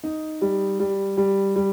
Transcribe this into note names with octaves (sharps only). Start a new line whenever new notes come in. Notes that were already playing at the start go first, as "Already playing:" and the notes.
D#4
G3
G3
G3
G3